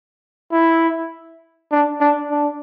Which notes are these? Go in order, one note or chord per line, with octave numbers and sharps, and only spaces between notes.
E4
D4
D4
D4